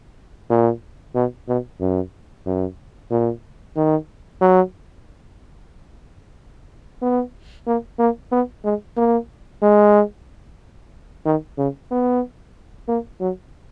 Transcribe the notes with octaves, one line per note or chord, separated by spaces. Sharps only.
A#2
B2
B2
F#2
F#2
A#2
D#3
F#3
B3
A#3
A#3
B3
G#3
A#3
G#3
D#3
C#3
B3
A#3
F#3